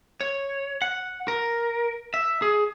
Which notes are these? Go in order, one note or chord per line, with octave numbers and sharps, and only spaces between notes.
C#5
F#5
A#4
E5
G#4